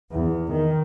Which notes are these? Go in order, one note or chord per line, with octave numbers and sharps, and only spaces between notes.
E2
D#3